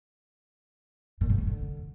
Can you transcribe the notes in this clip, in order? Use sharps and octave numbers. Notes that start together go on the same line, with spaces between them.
A#2
G#2
B2
D3